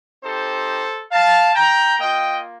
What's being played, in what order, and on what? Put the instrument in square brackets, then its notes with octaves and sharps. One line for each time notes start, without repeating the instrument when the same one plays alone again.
[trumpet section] C4 D#4 G4 A4 C5
F5 A5
G5 A#5
A#3 F4 D#5 G5